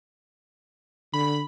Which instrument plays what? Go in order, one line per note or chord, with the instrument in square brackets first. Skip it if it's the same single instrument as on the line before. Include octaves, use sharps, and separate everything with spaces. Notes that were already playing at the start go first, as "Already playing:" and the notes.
[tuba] D3 [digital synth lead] B5